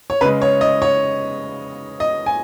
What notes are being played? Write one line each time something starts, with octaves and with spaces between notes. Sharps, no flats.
C#5
C#3 G#3 B4
C#5
D#5
C#5
D#5
G#5